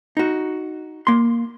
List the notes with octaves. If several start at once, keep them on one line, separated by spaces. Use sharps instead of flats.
D#4 F#4
A#3 C6